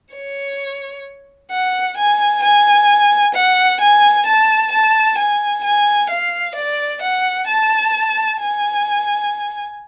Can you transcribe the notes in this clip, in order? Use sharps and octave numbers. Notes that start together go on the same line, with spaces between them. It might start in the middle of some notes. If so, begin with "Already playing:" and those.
C#5
F#5
G#5
G#5
F#5
G#5
A5
A5
G#5
G#5
F5
D5
F#5
A5
G#5